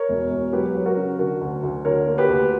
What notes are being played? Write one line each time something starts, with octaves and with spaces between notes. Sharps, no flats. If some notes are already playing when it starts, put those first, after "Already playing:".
Already playing: A#4 C#5
E1
E1
F#3 G4 B4
F#3
F#4 A#4
C#3
D3 F#4 A#4
D2
D2
D3 A#4 C#5
A#3
G4 B4
D2